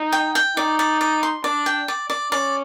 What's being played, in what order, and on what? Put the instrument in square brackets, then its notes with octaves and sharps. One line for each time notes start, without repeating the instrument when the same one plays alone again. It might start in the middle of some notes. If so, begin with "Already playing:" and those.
Already playing: [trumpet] D#4
[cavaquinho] G5
G5
[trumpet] D#4 [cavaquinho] D5
[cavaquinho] D5
D5
C6
[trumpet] D4 [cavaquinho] D5
[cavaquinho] G5
D5
D5
[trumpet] C#4 [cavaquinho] D5